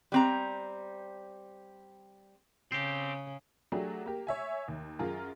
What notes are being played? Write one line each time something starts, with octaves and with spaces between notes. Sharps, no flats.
G3 C4 A#5
C#3 C4 G4
F#3 A3 D4 G4 G#4
A#3 G4
C#5 E5 G#5
D#2
F#2 F4 G#4 A#4